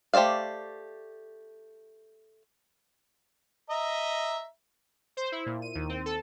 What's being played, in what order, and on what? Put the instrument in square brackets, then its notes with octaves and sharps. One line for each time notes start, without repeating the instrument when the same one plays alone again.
[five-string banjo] A3 G4 C5 D5 F5
[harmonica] D#5 E5 A#5
[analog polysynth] C5
E4
A#2
D#7
D#2
C4
A4